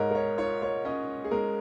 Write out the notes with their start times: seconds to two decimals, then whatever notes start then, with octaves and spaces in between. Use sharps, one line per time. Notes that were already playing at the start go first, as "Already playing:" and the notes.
Already playing: G#2 G#3 A#4 C#5 D#5
0.11 A#4
0.15 C#5
0.38 F4 C#5
0.62 C#5
0.85 C#4 D#5
1.24 G#4
1.31 G#3 A#4